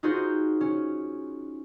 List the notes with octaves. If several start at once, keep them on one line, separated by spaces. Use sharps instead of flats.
D#4 F4 F#4 G#4 C5
C#4